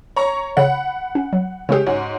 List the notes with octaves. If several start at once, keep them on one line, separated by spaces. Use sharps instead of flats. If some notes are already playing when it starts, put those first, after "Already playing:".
C#5 A#5 C#6
C#3 C#5 F#5 B5
C#4
F#3
C#3 G#3 C#4 G4 G#4
G#2 C#4 F#4